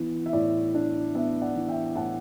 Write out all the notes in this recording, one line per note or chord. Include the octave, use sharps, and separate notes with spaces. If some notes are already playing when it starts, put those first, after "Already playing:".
Already playing: E3 B3
E5
A2 D5
D4
B3 E5
D5 F#5
E3
E5 G5
A2 F#5 A5